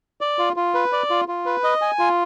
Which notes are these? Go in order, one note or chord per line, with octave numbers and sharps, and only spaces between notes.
D5
F4
F4
B4
D5
F4
F4
B4
D#5
G#5
F4